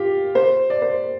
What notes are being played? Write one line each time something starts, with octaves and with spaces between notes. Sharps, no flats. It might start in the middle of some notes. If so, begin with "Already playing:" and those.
Already playing: F4 G4
C5
D5
C5